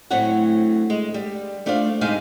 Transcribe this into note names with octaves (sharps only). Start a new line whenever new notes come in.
D2 A2 F#3 C4 C#5 F#5
G#3
G3
A3 D4 F4 C5 F5
G#2 C3 G#3 D#4 G#4 F5